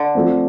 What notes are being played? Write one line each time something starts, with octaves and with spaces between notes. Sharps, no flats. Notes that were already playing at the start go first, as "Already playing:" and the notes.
Already playing: D3
F3 A3 C4